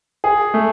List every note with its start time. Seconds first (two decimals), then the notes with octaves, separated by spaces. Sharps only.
0.24 G#4
0.54 A3